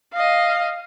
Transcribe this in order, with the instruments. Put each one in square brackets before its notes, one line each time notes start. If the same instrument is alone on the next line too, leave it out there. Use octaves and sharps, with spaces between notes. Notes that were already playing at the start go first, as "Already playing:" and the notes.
[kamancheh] D#5 F5